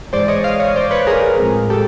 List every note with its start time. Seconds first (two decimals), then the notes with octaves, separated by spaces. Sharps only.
0.13 G#2 E3 G#3 C5 D5
0.28 C#5 D#5
0.44 D#5 F5
0.60 C#5 D#5
0.76 C5 D5
0.91 B4 C#5
1.07 G#4 A#4
1.39 A2 F3 G#3 C4
1.70 G4 A4